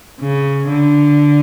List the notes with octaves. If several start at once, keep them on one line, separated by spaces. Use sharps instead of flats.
C#3
D3